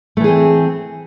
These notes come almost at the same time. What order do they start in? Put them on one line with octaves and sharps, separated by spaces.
A3 E3 G#4 C4